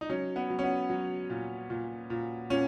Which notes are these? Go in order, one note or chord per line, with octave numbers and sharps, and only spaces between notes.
D#4
F#3 C#4
B3
F#3
C#4
B3
F#3
A#2
A#2
A#2
A#2 C#4